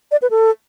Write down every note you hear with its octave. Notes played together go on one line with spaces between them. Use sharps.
D5
B4
A4